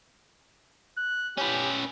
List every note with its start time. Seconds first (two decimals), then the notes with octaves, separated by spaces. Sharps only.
0.98 F#6
1.38 C#4 G4 B4